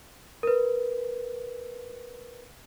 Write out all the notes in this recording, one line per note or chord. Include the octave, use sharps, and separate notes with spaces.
A#4 B4